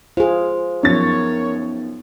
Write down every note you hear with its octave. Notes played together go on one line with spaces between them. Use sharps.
F4 G#4 C5
F#2 F3 B3 C#4 D#4 A#4 C#5 A6